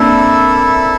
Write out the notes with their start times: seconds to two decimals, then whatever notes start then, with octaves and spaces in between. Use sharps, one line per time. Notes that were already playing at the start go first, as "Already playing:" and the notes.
Already playing: A#3 C4 D4 E4 A4 E5